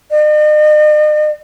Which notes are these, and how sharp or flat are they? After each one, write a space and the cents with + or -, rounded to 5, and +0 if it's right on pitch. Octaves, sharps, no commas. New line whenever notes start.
D#5 -45